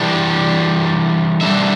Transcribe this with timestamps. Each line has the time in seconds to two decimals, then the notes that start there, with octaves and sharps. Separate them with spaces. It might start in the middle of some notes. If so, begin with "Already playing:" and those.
Already playing: E3 G3 D4 D5
1.41 D3 G3 D4 E5